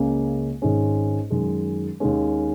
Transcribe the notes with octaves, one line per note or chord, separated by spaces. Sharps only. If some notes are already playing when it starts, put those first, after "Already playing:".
Already playing: C#2 C#3 A#3 C#4
G#1 G#2 G#3 C#4
F#2 D#3 G#3
D#2 D#3 G#3 C#4